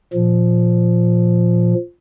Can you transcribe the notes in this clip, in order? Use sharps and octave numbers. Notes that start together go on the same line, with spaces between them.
A#2 F3